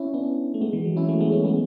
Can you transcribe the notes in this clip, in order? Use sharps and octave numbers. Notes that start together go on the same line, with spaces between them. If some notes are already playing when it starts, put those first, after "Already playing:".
Already playing: C#4 E4
B3 D4
A3
G#3 B3
E3 G#3
F#3
C#4 E4
F#3 A3
G#3 B3
A3 C#4
G#3 B3